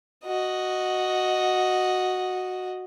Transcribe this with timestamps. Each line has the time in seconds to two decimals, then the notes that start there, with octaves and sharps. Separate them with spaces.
0.25 F#4 D#5